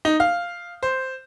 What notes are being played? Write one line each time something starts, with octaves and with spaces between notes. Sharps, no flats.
D#4
F5
C5